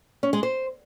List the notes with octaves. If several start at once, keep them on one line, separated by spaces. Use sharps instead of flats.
C#4
G#3
C5